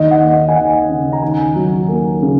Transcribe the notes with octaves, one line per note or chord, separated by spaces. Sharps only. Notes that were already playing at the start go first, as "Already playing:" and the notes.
Already playing: D#2 D#5
F#5
A#3
D#5
G#5
D#2 F#5
C#3
A#5
D#2 G#5
F#3
A#3
C#3